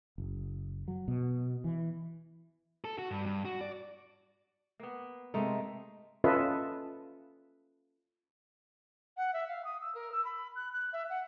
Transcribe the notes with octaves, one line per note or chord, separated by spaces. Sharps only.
F#1
F#3
B2
E3
A4
F#4
G2
G2
F#4
D5
A#3 B3
C3 G#3 A3 D#4 A#4
C#4 F4 A4 B4 D#5 E5
F#5
E5
F5
D#6
E6
A#4
E6
B5
F#6
F#6
E5
F#5